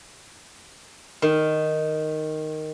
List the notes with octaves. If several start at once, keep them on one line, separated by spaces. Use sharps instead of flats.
D#3